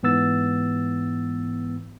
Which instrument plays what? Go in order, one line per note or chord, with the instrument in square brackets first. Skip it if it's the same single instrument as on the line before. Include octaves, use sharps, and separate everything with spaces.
[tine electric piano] G#2 E3 B3 E6 A6